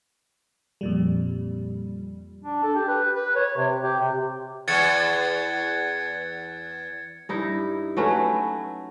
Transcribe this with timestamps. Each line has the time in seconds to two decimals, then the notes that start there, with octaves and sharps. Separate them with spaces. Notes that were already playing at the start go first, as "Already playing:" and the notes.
0.81 F2 A#2 G3
2.43 D4
2.63 A4
2.75 G4
2.88 B4
3.14 B4
3.36 C#5
3.57 C3
3.83 G4
3.99 C3
4.68 E2 G#6 A6 C#7
7.29 G2 D#4 E4
7.97 F#3 A3 C#4 B4